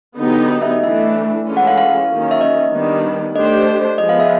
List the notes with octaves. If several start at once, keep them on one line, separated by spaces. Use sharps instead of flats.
D3 F#3 B3 D#4 G4
D#5
E5
D#5
E3 A3 D4 E5
E3 G#3 C#4 F4 A4
F#5
F5
F5
D#3 F#3 A#3 C#4
E5
D#5
D#3 G3 B3 D4
A3 D4 G4 C5 D#5
F3 G#3 B3 D#5
F5
E5